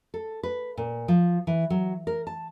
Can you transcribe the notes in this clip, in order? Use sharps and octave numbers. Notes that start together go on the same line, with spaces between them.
A4
B4
A#2
F3
E3
F#3
A#4
A5